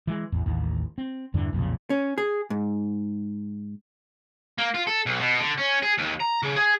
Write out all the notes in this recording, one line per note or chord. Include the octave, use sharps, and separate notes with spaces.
E3 G#3
A1 E2
A1 D#2
C4
E2 G2 D3 E3
B1 F2 A#2 C#3
C#4
G#4
G#2
A#3
F4
A4
B1
B2
D3
C#4
G#4
D#2
A#5
C#3
G#4